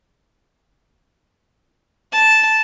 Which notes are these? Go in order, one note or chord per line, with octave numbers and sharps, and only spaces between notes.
A5